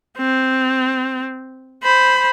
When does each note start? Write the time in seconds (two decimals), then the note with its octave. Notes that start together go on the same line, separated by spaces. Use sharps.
0.18 C4
1.83 C5 B5